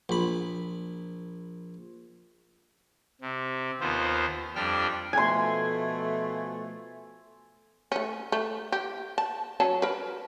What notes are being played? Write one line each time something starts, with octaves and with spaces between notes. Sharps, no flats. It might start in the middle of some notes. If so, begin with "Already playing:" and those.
A#1 B5
C3
D#2 B3 F4 C5
F2 G3 D4 G5 F6
B2 F3 A3 G#5 C6
A3 C#4
A3
G4
A5
F#3 C#4 A5
A#4 B4